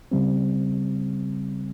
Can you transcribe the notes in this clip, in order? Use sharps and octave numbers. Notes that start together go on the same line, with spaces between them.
C#3 G3 C4